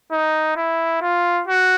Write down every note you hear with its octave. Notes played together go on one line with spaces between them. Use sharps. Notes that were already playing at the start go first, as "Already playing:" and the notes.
D#4
E4
F4
F#4